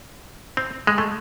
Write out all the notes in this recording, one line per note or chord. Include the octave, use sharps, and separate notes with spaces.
C4
G#3
A3